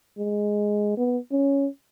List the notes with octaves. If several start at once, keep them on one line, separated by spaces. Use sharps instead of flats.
G#3
B3
C#4